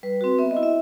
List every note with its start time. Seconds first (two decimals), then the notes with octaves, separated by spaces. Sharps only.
0.03 G3 B4
0.21 C4 F#4
0.39 B3 E5
0.51 D#5
0.57 E4
0.63 E5